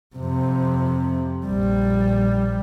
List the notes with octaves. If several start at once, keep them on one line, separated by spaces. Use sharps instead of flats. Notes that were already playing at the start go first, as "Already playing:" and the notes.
F2 C3
A#1 G3